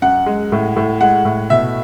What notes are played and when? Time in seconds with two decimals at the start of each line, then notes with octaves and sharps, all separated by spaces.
0.02 F#2 F#5
0.26 G#3
0.52 A2
0.76 A2
1.01 G#3 F#5
1.25 A2
1.50 B2 E5